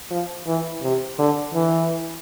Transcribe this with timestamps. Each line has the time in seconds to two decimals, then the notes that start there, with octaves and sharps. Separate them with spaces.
0.11 F3
0.47 E3
0.83 C3
1.18 D3
1.54 E3